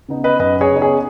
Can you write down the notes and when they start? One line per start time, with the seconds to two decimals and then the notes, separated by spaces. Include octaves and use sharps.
0.08 C#3 B3 D#4
0.24 B4 D#5
0.39 F#2 B4 D#5
0.61 G#4 C#5
0.71 C#3 B3 D#4
0.82 G#4 C#5